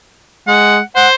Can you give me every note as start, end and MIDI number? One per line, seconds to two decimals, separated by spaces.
0.48 0.79 56
0.48 0.81 78
0.96 1.15 72
0.96 1.08 78